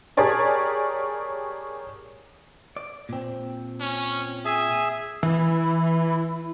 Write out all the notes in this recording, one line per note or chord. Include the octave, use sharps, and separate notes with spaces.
G4 G#4 A#4 C#5 D5 A5
D5
A#2 C4
C#4
G#4 E5 G#5
E3 E4